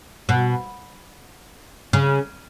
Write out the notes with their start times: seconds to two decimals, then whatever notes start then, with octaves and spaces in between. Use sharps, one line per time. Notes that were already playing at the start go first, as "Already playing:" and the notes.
0.29 B2
1.93 C#3